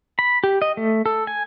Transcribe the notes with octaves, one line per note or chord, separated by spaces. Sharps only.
B5
G4
D#5
A3
A4
G#5